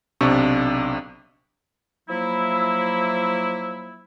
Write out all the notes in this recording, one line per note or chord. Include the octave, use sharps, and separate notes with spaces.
B1 C3 D4 C#6
F3 F#3 A#3 E4